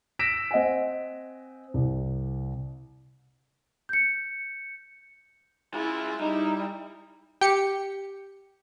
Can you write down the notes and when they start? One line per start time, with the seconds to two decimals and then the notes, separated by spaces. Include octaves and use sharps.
0.19 E6 A#6 B6 D7 E7
0.51 C4 D#5 F#5 G#5
1.74 C2
3.89 G6 C#7
5.74 G#3 E4 F4
6.21 G3 D#4 E4
7.41 G4 C#7